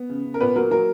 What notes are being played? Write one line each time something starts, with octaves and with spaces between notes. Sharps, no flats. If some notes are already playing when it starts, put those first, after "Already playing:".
Already playing: B3
C#3
C#3
A#4
A#2 B3 B4
F#3 A#3 A#4
F#3 A#3 A#4